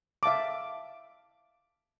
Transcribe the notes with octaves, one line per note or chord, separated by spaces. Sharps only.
E5 F5 A5 D6